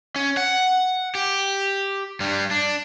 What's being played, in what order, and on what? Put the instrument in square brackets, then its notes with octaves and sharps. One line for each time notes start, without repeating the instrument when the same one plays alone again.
[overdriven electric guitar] C#4
F#5
G4
G2 G3
D4